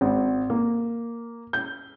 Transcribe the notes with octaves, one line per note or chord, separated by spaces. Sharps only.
G#1
A#3
G6